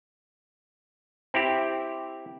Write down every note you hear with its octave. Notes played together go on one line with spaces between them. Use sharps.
C4 E4 G4